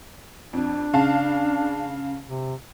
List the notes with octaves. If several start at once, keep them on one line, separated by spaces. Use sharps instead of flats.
F2 D4
C#3 F5 A5
C3